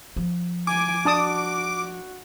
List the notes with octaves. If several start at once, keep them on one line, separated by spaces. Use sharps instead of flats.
F3
G#5 D6
D4 F#4 A5 D#6